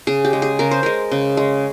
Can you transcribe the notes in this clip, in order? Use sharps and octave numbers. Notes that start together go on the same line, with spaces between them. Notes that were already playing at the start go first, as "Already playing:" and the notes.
C#3 G#4
G4
G#3
G#4
C#3 A#4
C5
G#3 A#4
C#3
G#3